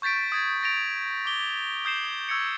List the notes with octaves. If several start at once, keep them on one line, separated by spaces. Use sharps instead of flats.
C#6 G6 A6 B6 D7
D#6 G#6 A6
A6 A#6 D7 F7
D6 G7
D#6 G6 C7 E7
C#6 E6 G#6 C#7